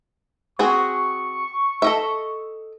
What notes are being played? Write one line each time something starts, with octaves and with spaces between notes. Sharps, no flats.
C4 F#4 G#4 C#6
A4 D#5 E5